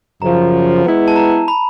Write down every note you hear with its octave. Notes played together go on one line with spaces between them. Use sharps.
F#2 C#3 F3 A#5
G#3 B3 E4
A5
A#5
B5